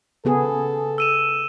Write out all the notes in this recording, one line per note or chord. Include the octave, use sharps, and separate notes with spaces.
C#3 B3 G#4 A4
E6 D#7 E7